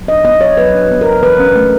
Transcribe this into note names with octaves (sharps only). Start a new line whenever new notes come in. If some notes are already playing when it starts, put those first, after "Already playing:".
Already playing: F#3
D4 D#5
B3 D#5
F#3 C#5
F#3 B4
D4
B3
A#4
F#3
E3 B4
C#4
A3